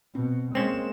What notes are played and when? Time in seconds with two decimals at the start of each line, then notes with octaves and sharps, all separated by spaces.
0.15 B2 C4
0.55 G#3 A#3 C4 C#4 E7